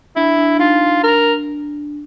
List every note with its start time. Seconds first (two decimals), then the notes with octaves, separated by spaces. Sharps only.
0.16 D4 E4
0.38 D4
0.59 D#4 F4
0.82 D4
1.03 A#4